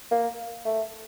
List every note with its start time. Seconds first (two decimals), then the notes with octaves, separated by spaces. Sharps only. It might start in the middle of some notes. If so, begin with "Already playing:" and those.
0.11 A#3
0.65 A3